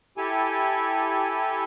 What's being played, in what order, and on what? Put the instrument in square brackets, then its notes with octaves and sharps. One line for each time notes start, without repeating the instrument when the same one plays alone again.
[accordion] E4 G4 A4 G#5